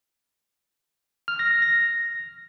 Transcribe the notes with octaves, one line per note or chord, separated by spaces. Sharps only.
F6
A#6
A#6
A#6